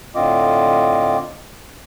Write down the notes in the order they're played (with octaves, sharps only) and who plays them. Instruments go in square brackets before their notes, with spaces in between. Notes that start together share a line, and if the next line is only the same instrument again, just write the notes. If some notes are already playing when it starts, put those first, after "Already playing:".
[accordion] A2 D3 C4 F4 D#5 D6